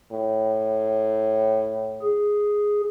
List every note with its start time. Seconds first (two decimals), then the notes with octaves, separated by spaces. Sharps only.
0.12 A2
2.02 G#4